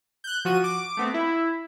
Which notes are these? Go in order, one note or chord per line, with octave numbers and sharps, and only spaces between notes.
F#6 G6
F3 F4 F#4 D#7
D6
A3 B3 C4
E4